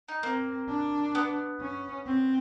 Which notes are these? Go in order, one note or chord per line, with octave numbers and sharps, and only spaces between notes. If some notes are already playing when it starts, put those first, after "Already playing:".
D#4
A#3 C4
D4
B3
C#4
C4